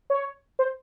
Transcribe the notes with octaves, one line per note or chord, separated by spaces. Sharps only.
C#5
C5